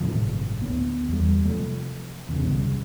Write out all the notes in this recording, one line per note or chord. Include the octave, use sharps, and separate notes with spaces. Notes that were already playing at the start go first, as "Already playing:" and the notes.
G1 A2 C3 F3
D2 B3
E2 G3
C3 F3 A3
E2 C#3
F1 C2 C#3